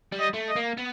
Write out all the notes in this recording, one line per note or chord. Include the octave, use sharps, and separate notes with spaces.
G3
D#5
A3
D#5
A#3
B3